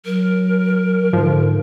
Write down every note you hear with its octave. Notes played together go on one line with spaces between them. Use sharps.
F#3 A#4
G#2 D3 F3